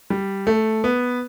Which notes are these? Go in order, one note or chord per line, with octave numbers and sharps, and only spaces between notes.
G3
A3
B3